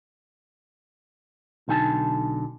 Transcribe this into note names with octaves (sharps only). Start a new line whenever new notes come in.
B1 D3 D#4 G#5 A5